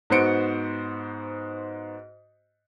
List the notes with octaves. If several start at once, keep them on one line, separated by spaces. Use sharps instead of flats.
G#2 B3 F#4 C5 C#7 D7